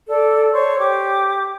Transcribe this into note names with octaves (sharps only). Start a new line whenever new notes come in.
A4 D5
C5 C#5 C#6
G4 D6